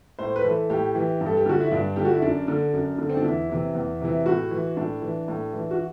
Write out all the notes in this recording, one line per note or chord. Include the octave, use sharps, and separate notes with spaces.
A2 C5
B4
E3 A4
A2 G4
E3
G2
A4
G4
D3 F#4
E4
G2 D4
D3 G4
F#4
E4
F#2 D4
D3
F#2
D3
C4
D4
E2 E4
C3 E3
E2
C3 E3
A2 F#4
E3
A2 D4
E3
A2
E3
F#4